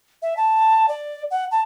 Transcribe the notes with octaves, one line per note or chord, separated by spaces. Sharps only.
E5
A5
D5
F#5
A5